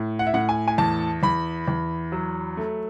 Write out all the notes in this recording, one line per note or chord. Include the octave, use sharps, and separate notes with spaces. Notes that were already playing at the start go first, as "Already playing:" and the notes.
Already playing: A2
F#5
E5
A2 F#5
G#5
G#5
E2 A5
E2 B5
E2
F#3
A3